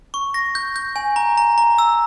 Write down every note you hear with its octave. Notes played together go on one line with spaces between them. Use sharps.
C#6
A#6
G6
G6
G#5
A#5
A#5
A#5
E6